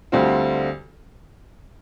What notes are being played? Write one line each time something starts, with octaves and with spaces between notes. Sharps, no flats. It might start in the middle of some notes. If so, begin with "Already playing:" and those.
D2 D3 G3 C4 F4